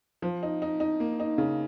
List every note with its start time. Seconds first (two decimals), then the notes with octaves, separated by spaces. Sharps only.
0.22 F3
0.43 D#4
0.62 D#4
0.80 D#4
1.00 A#3
1.20 D#4
1.38 C#3